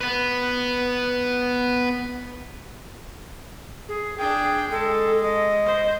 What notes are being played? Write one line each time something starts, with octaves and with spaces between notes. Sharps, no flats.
B3 B4
G#4
D4 G#4 G5
G#3 A4
D#5
C5